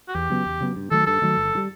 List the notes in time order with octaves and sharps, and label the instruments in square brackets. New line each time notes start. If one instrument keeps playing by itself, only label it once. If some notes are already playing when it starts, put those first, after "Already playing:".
[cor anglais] F#4
[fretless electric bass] E2 [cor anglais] G4
[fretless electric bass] C#3 F#3 B3
E2
C#3 F#3 B3
G2
[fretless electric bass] D#3 F#3 A3 [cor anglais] A4
[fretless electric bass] G2 [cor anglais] A4
[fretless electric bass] D#3 F#3 A3
G1
D3 G3